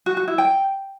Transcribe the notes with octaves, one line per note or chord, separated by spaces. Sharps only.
F#4
F#4
E4
G5